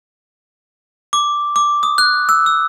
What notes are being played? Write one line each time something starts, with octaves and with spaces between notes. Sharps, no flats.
D6
D6
D#6
F#6
E6
E6